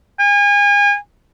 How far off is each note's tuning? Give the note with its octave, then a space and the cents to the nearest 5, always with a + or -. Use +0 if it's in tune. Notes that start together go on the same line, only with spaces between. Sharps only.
G#5 -35